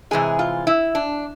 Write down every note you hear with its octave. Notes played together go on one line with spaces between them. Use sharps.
C3 E3 G#3 G#4
F4
E4
D4